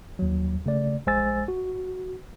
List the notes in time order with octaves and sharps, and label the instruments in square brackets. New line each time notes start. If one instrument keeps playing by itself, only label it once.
[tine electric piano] D#2 F#3
C#3 A3 D5
A#1 G#3 C5 G#5 E6 A6
F#4